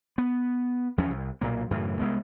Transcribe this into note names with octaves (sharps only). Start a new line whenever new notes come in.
B3
E2 F3 C#4
C2
B1 A#2 A#3
F#2 A2 C#3 E3
C2 G#3 B3